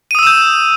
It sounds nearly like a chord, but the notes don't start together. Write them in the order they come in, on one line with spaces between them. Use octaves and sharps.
D#7 D#6 E6 E7 G6